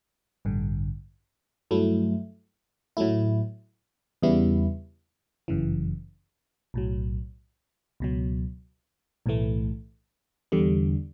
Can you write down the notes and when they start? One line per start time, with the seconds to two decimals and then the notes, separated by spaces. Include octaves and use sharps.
0.45 A1 G2 D3
1.71 G2 F#3 A3 E4
2.97 A2 F#3 A3 E4
4.23 E2 C#3 G3 B3 E4
5.48 G1 F#2 C#3 E3
6.74 B1 A2 F#3
8.00 C#2 B2 F#3
9.26 B1 A2 E3 A3
10.52 E2 D3 G3